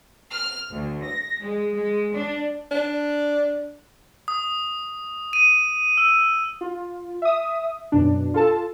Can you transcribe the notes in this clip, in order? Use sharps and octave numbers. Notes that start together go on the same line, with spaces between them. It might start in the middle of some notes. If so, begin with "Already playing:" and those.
F6
D2
A#6
G#3
G#3
D4
D4
D#6
D#7
E6
F4
E5 D#6
F#2 B2 D4
F4 A4 A5